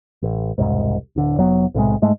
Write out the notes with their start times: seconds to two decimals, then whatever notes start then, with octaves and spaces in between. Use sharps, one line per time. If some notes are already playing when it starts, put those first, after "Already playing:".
0.23 A1
0.58 E1 C2 G#2
1.16 D1 D3
1.37 F1 F#3 B3
1.74 B1 A2 C3 G#3
2.02 G#2 G#3 A3